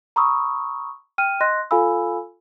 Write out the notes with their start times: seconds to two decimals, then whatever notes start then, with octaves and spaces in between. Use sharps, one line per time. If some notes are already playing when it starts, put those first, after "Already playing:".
0.16 A#5 B5 C#6 D#6 E6
1.18 G5 F6 D#7
1.41 D#5 C6 F#6 A#6
1.71 F4 A4 F5 G#5 B5 E6